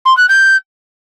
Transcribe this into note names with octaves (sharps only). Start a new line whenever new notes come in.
C6
F#6
G6